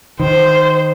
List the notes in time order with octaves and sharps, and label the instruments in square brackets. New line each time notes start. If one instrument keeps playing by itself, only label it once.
[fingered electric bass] D#3 [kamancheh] C5